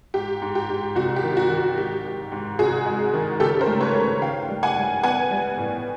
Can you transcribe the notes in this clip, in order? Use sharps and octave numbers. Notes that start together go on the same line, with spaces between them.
G#2 G4
G#2
G4
G#2
C2 F#4
G4
D#3
F#4
D#3
F#4
G#2 G4
G#2
G#2
C2 F#4 G#4
G#3
D#3
C#3 G4 A4
A#4 C5
A3
B4 C#5
A3
D#3 F5 G5
G3
F#5 G#5
G3
B3 F#5 G#5
G3
A2